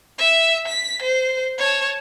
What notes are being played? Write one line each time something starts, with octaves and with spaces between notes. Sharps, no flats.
E5
B6
C5
C#5 A5